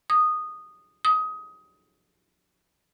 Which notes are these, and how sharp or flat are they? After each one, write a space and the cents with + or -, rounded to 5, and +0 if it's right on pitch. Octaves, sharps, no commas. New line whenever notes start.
D#6 -10
D#6 +20